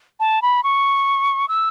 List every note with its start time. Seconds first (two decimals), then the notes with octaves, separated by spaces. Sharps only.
0.20 A5
0.42 B5
0.63 C#6
1.48 E6